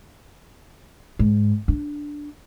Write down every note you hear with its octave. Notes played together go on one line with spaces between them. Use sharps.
G#2
D4